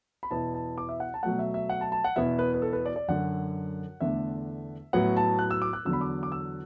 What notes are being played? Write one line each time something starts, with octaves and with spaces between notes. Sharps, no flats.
B5
E2 B2 B3 E4 A5
A5
D6
E5
F#5
A5
B2 F#3 A3 F#5
E5
E5
F#5
A5
A5
F#5
E2 B2 B3 E4 E5
B4
B4
A4
B4
D5
D5
F#2 D3 F#3 F#5
E2 D3 A3 D4 E5
A2 F#3 B3 E4 F#5
A5
F#6
E6
D6
F#6
E2 D3 F#3 E6
B5
D6
D6
E6